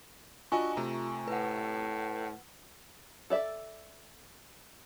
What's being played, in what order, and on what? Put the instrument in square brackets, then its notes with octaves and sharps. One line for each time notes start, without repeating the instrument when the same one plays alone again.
[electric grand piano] D4 F#4 D#5 [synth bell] F4 G#5 C#6
[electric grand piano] C3 A3 A#5
[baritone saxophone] A2 [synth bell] B4 F#5
[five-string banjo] A4 D5 E5